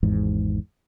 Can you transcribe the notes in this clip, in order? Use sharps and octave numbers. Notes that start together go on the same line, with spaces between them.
G#1 E2 G#2